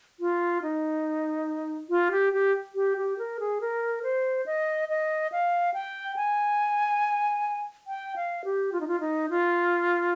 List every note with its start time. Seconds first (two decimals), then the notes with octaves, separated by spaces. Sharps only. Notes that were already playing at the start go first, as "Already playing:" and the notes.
0.20 F4
0.62 D#4
1.90 F4
2.11 G4
2.33 G4
2.75 G4
2.97 G4
3.18 A#4
3.40 G#4
3.61 A#4
4.03 C5
4.46 D#5
4.89 D#5
5.32 F5
5.74 G5
6.16 G#5
7.87 G5
8.16 F5
8.45 G4
8.72 F4
8.81 D#4
8.88 F4
9.01 D#4
9.30 F4